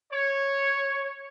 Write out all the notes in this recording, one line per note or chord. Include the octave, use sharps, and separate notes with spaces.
C#5